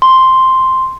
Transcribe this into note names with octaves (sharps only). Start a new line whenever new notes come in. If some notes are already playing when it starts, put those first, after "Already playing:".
C6